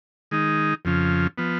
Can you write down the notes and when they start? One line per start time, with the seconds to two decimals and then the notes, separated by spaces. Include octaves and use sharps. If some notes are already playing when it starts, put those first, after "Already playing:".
0.31 D#3 G#3 D#4
0.85 F2 C#3 F3
1.38 F3 B3